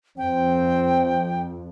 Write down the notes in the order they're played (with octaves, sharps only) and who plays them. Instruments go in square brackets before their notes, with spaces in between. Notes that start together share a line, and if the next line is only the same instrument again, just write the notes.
[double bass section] F2 [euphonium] C4 [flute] G5